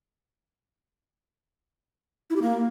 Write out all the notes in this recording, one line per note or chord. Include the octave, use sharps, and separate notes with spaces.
E4
G4
A#3